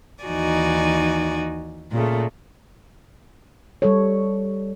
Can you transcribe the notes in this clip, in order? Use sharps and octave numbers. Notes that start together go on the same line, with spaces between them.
D#2 E3 D#4 F#4 D5 G#5
A#2 C#3 A3
G3 A4 C#5